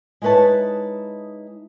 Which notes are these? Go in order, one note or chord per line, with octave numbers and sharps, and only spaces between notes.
G#3 D#4 E4 B4 C#5 A5